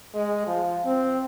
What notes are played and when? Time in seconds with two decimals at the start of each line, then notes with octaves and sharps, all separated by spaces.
0.15 G#3
0.47 F3
0.85 C4